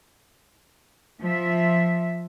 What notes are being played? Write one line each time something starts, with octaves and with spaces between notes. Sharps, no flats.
F3 E5